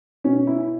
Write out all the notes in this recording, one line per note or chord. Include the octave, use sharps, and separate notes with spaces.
B2 C#4
E4